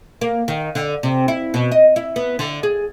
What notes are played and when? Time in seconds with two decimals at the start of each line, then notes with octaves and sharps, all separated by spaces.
0.21 A#3
0.48 D#3
0.75 D3
1.03 C3
1.28 E4
1.54 B2
1.72 D#5
1.96 E4
2.16 B3
2.39 D3
2.63 G#4